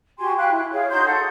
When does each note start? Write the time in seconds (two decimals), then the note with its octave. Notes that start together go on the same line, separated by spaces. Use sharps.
0.18 F#4 G4 G#5 C6
0.37 F5 G5 B5 F#6
0.50 E4
0.72 G#4 C#5 F5
0.89 D#4 F#4 C6 G6
1.05 A4 F#5